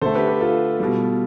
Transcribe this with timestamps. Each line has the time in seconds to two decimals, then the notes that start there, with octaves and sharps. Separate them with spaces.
0.01 D3 A3 A4 C5
0.15 G4 B4
0.27 G4 B4
0.41 F4 A4
0.80 B2 G3